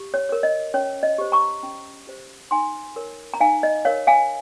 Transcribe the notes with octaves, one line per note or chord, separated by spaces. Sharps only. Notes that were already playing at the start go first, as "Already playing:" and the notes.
Already playing: G4
C#5
A#4 C#5
D#5
C#4 C#5
D#5
G4 C5
A#5 C#6
C#4
G4 C5
D#4 G#5 C6
A#4 C#5
A#5
D#4 F5 G#5
D#5
A#4 C#5 F5
F5 G#5